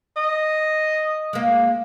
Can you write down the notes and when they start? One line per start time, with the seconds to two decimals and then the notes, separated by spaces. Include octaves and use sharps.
0.17 D#5
1.33 G#3 A#3